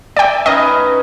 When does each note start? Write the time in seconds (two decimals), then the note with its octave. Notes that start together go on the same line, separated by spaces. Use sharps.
0.16 D5 E5 G5
0.46 C#4 D#4 B4 D#5